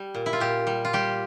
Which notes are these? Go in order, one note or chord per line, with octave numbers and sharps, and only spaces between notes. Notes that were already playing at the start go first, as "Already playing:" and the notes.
Already playing: G3
A#2
E4
F4
A#2 G4
G3
F4
G3 G4